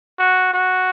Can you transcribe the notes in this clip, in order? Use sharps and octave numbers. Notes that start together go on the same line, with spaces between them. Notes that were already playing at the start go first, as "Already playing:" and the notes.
F#4
F#4